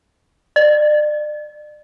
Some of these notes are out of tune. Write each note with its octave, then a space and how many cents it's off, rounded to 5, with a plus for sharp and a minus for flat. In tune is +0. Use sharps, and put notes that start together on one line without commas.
D5 +35